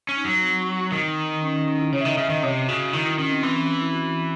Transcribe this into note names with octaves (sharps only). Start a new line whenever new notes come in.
C#4
D#4
F#3
C4
D#3
C#4
C#4
C#4
E4
C#3 C#5
E5
D#3 D#5
C#3 E5
D#3 D#5
C3 C#5
C#3 F#4
D#3 E4
E4
D#3 C#4
C4
E3 C4
C#4
E4
F#4
E4